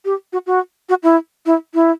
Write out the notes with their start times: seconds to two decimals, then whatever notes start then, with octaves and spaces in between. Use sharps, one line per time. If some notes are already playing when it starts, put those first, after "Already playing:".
0.05 G4
0.33 F#4
0.47 F#4
0.89 F#4
1.03 E4
1.46 E4
1.74 E4